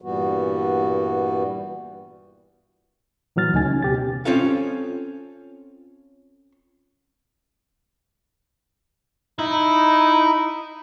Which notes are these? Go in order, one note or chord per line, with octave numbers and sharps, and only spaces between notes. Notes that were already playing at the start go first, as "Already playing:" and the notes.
G2 A#2 E3 G3 B3 F#4
A#2 E3 F#3 F6 A6
D2 C#3 A3 D#4 G#5 A6
C#4
B2 G4 A6
C4 C#4 F4 A4 F5
D#4 E4